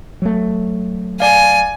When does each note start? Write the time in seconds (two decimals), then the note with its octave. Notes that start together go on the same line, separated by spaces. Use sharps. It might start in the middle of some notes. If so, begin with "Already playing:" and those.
0.22 F#3 A3
1.20 D5 F5 G#5